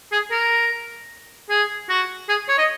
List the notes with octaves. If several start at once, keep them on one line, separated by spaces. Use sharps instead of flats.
G#4
A#4
G#4
F#4
G#4
C#5
D#5